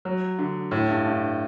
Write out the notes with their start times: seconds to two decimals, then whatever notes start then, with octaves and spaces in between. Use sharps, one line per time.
0.05 F#3
0.39 D3
0.71 A2
0.89 G2
1.06 G2